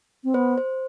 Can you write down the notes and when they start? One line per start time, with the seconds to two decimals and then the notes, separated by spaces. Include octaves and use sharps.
0.24 C4
0.34 B3 C5
0.58 C5